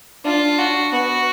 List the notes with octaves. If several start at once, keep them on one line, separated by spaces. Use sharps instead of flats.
D4 F4
D4 F#4
B3 F#4